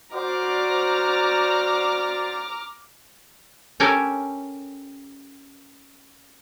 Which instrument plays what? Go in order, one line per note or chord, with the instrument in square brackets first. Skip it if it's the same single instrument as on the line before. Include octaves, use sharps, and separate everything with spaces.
[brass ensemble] F#4 C5 D5 [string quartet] A#5 D6 F6
[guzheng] C#4 G4 A4 A#4 G#5 A5